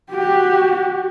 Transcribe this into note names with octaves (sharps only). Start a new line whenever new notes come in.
F#4 G4